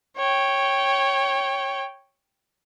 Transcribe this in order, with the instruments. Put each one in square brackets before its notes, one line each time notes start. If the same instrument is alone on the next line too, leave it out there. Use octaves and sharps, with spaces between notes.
[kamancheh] C#5 G5